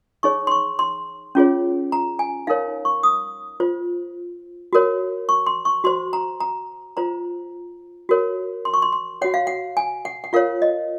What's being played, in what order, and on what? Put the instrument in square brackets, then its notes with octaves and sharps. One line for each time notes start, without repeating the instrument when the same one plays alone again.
[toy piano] D#4 G#4 C#5 C#6
C6
C#6
C6
C#4 F4 G#4 C#5
A#5
G#5
D#4 A#4 C#5 F5
C#6
D#6
F4 C5
F#4 A#4 C#5
C#6
C6
C#6
F#4 C5 C6
A#5
A#5
F4 C5 A#5
F#4 A#4 C#5
C6
C#6
C6
C6
F#4 C#5 F#5
F5
F#5
G#5
F#5
F#5
F4 A#4 C#5 F5
D#5